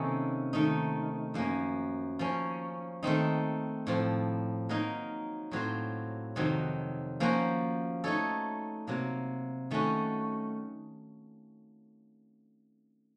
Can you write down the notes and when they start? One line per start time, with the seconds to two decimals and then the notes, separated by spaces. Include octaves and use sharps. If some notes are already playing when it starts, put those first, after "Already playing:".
Already playing: C3 D#3 A#3 C#4 A4
0.53 D#3 A3 D#4
1.34 F#2 F3 A#3 C#4
2.19 F3 A#3 C#4
3.03 D#3 A3 C4 D#4
3.87 A2 F3 C4
4.69 F#3 A#3 D#4 A#4
5.51 A2 F#3 C4 F4 C5
6.36 F2 C3 D#3 F#3 C4
7.20 F3 A#3 C#4 F#4 C5
8.04 A3 D#4 A4 C#5
8.87 C3 F#3 A#3
9.71 D#3 A3 C#4 F#4